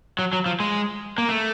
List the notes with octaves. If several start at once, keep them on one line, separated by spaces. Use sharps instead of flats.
F#3
F#3
F3
G#3
A#3
A3